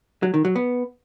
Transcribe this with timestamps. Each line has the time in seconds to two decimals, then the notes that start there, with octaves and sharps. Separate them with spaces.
0.23 F#3
0.34 D#3
0.45 F#3
0.56 B3